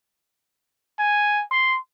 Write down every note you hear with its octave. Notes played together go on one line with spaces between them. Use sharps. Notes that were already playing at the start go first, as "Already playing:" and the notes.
G#5
C6